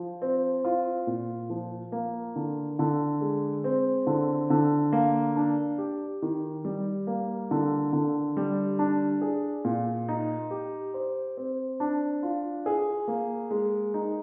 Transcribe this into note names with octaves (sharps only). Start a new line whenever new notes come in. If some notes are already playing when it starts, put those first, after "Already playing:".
Already playing: F3
C4
F4
A#2
F3
A#3
D3
D3
G#3
C4
D3
D3
A#3
D4
G4
D#3
G3
A#3
D3
D3
G3
D4
G#4
A#2
D#4
G4
C5
C4
D4
F4
G#4
A#3
G#3
D#4